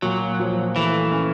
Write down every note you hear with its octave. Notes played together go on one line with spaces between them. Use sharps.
A#2 F#3
F3
E3 A3
C#4